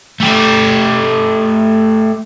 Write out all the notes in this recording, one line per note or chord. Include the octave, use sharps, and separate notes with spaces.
A3 G4